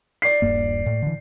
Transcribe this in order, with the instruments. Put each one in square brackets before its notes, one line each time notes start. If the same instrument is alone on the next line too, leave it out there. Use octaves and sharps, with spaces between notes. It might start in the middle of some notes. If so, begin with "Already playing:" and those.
[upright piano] D5 C7
[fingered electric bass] D#1 G2 A#3
A2
D3 E3